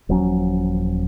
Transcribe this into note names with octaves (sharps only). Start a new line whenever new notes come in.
D#1 F3 F#3 C#4